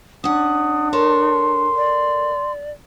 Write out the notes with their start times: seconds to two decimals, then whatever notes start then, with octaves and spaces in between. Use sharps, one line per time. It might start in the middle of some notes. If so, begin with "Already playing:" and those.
0.24 C#4 D4 F#5 D#6
0.93 A4 A#4 C#5 C6
1.77 D5